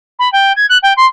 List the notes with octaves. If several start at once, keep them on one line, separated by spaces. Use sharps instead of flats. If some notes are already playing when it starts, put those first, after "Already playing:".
B5
G5
G#6
F#6
G5
C6